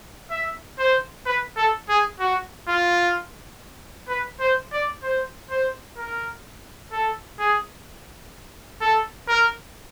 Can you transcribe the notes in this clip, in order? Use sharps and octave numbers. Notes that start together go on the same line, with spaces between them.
E5
C5
B4
A4
G#4
F#4
F4
B4
C5
D5
C5
C5
A#4
A4
G#4
A4
A#4